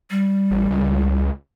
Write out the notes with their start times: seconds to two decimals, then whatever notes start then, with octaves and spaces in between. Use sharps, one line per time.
0.11 G3
0.51 A1
0.70 C#2